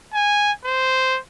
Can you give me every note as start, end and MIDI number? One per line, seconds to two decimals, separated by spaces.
0.14 0.52 80
0.65 1.19 72